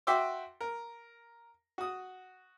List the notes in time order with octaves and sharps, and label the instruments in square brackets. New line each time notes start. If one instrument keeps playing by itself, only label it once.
[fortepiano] F#4 E5 G5 C6 D6 E6
A#4
F#4 D#6